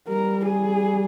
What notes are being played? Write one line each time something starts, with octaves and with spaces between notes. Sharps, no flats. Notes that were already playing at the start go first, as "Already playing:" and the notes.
G3 A#4
G#4